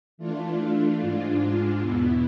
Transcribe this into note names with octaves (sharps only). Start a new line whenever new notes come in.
E3 A3 D4 F4
G#2 G#3 D4 F4
E2 B2 B3 E4